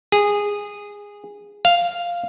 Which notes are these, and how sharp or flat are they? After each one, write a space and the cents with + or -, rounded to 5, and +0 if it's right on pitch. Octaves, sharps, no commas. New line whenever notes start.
G#4 -15
F5 -5